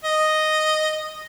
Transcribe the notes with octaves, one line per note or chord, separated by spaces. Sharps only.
D#5